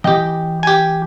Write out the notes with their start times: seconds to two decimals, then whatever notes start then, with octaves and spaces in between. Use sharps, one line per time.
0.04 E3 G4 D#5 G5
0.63 G4 G#5